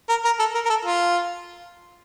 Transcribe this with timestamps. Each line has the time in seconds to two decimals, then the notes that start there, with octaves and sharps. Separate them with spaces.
0.09 A#4
0.25 A#4
0.40 A4
0.55 A#4
0.65 A#4
0.70 A4
0.85 F4